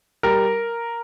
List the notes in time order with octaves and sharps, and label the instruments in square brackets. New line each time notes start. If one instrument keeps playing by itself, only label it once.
[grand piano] G3 A#4